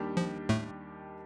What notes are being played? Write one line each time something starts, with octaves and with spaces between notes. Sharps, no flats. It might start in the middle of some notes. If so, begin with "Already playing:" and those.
Already playing: D#2 D#3 G3 D4 G4
F3
A2 A3